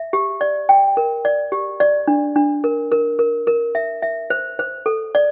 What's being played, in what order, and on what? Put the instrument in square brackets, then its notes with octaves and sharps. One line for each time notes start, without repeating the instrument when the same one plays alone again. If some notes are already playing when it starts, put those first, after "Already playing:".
Already playing: [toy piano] E5
G4
D5
G5
A#4
D5
G4
D5
D4
D4
A#4
A#4
A#4
A#4
E5
E5
C5
C5
A4
D5